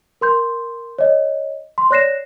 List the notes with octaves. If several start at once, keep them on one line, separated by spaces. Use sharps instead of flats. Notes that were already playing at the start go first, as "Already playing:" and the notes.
A#4 C6 G6
C#5 D#5
C6
C#5 D5 F#6 A#6 C7 E7